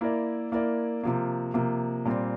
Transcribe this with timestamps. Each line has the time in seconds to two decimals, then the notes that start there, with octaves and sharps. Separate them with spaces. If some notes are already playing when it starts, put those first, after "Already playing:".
0.01 A#3 E4 A#4 D5
0.52 A#3 E4 A#4 D5
1.03 C3 F3 A#3
1.54 C3 F3 A#3
2.05 A#2 G3 C4